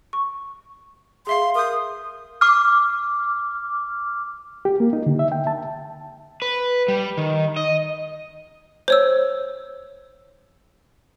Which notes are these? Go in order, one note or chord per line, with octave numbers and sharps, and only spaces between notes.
C#6
G#4 E5 F5 C6
A#4 D#6 G6
D6 F6
G4
A#3
D#4
D3
E5
G5
A5
B4
G3
D#3
D#5
C5 C#5 E6